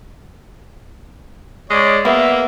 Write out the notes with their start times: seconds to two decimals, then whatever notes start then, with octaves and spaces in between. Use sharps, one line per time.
1.70 G#3 C#5 D5
2.05 A#3 B3 E5